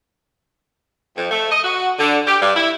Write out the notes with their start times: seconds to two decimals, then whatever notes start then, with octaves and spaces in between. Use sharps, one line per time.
1.17 F2
1.31 A3
1.50 D#5
1.64 F#4
1.99 D3
2.27 G4
2.41 G2
2.55 E4